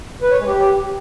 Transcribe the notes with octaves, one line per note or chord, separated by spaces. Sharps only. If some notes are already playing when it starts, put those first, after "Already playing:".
B4
C#5
G#3
G4